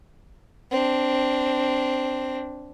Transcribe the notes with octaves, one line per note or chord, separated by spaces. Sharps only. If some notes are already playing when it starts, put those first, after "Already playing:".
C4 D4